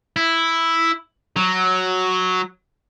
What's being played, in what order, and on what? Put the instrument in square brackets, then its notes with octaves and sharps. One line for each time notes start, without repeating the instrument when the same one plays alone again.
[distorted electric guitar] E4
F#3